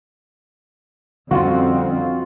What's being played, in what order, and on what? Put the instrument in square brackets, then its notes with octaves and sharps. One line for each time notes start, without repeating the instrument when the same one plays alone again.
[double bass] F2 C4 [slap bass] D3 G3 C#4 [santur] F4 F#4 [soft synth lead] F5